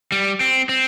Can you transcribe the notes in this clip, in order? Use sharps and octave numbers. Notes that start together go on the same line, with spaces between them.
G3
C4
C4